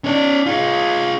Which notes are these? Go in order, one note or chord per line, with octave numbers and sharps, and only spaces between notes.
C#4 D5
F4 G#4